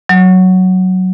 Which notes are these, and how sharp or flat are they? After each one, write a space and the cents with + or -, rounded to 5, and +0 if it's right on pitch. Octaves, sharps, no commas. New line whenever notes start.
F#3 +0